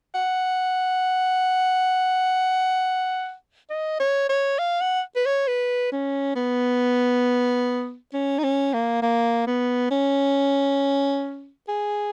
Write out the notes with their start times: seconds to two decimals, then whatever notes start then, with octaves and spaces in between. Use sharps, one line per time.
0.15 F#5
3.70 D#5
4.00 C#5
4.29 C#5
4.59 F5
4.81 F#5
5.16 B4
5.26 C#5
5.47 B4
5.92 C#4
6.36 B3
8.14 C#4
8.39 D#4
8.44 C#4
8.74 A#3
9.02 A#3
9.47 B3
9.91 C#4
11.69 G#4